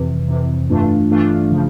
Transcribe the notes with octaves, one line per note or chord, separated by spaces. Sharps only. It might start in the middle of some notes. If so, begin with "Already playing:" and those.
Already playing: F2 C3 E3
F2 C3 E3
G2 E3 A3 D4 F4
G2 E3 A3 D4 F4
C#3 F3